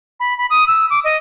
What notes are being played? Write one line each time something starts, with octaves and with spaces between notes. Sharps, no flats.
B5
B5
D#6
E6
D6
D#5